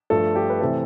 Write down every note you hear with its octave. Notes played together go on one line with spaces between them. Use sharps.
G2 F3 A3 A4
G4
B4
C3 E3 A3 C4 A4